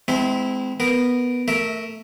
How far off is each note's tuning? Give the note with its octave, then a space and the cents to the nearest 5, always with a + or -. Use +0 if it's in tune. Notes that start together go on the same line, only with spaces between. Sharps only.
G#3 +15 C4 -30 E4 -10
B3 +0 A#4 +0
A3 +15 A#4 +0 E5 -20